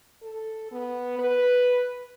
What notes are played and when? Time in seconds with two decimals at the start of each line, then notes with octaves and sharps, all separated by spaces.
0.23 A4
0.71 B3
1.19 B4